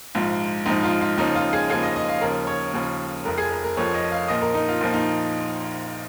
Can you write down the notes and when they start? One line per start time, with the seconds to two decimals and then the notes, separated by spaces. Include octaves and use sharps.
0.15 A#1 G#2 F3 F4
0.66 A#1 G#2 F3 D#4
0.83 F4
1.01 F4
1.18 D#2 C#3 F3 D#4
1.35 F4
1.53 G#4
1.70 D#2 C#3 F3 G#4
1.83 D#5
1.96 D#5
2.09 F5
2.21 D#2 C#3 F3 A#4
2.47 C#5
2.74 D#2 C#3 F3
3.25 F1 F2 F3 A#4
3.38 G#4
3.52 A#4
3.64 A#4
3.77 F1 F2 F3 C#5
3.94 D#5
4.11 F5
4.28 A#1 A#2 F3 D#5
4.42 A#4
4.54 D#4
4.68 F4
4.81 A#1 A#2 F3
4.94 D#4